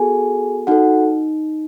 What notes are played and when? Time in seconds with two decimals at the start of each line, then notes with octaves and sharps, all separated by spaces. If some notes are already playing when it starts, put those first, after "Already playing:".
Already playing: B3 F#4 G#4 A4 G#5
0.67 D#4 F#4 A4 F#5